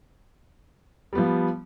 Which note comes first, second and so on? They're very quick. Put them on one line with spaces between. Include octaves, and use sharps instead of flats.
G3 B3 F3